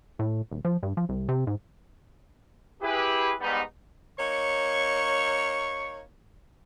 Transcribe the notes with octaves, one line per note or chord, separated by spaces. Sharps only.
A2
D#1
F3
G2
F3
C2
C3
G#2
E4 G4 G#4 B4
G#2 G3 B3 D#4
A#3 D#4 C#5 C#6